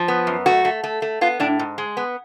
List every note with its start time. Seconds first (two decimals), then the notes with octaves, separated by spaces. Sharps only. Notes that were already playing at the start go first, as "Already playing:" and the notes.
Already playing: F3
0.08 B3
0.27 F#2
0.46 A3 F#4
0.65 A3
0.84 A3
1.02 A3
1.21 B3 F4
1.40 A2 D4
1.59 G#2
1.78 G#3
1.97 B3